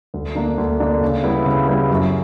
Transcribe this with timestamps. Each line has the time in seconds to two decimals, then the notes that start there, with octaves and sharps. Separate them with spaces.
0.14 D2
0.35 D3 A#3 D4
0.58 D2
0.80 D3 A#3 D4
1.01 C#3
1.24 G3 B3 E4
1.46 C#3
1.68 G3 B3 E4
1.90 F#2